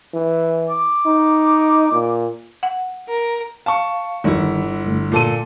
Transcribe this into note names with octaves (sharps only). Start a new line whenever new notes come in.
E3
D6
D#4
A#2
F#5
A#4
F5 A5 C#6
G1 D#3 G3 E4
G2 D3 A3
A#2 A4 D#7